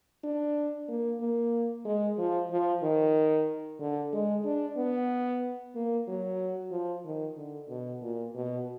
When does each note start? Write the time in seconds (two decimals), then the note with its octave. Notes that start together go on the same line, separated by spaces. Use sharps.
0.24 D4
0.88 A#3
1.20 A#3
1.85 G#3
2.18 F3
2.51 F3
2.83 D#3
3.79 D3
4.13 G#3
4.44 D4
4.77 B3
5.75 A#3
6.07 F#3
6.71 F3
7.05 D#3
7.37 D3
7.69 B2
8.02 A#2
8.34 B2